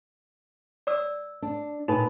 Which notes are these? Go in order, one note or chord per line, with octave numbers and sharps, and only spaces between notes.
D5 E6
D4
A#2 D#4 B4